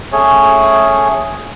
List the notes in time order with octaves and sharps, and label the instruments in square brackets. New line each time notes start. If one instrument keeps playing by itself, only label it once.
[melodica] A3 C#4 G#4 C#5